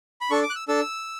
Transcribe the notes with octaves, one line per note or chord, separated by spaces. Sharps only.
B5
D4 A4 C#6
D6
F#6
E6
D4 A4 E6